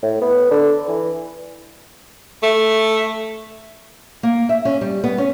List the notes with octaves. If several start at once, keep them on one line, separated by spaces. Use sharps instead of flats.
A2
B3
D3
E3
A3
A#3
E5
C#4
G3
B3
C#4